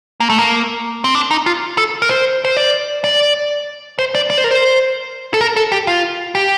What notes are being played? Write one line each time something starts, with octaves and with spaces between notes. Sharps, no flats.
A#3
A3
A#3
C4
D4
D#4
F4
A4
A#4
C5
C5
D5
D5
C5
D5
D5
C5
A#4
C5
A4
A#4
A4
G4
F4
G4